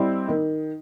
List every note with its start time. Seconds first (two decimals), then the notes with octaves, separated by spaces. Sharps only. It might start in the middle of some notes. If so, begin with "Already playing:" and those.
Already playing: G3 C4 E4 D#5
0.28 D#3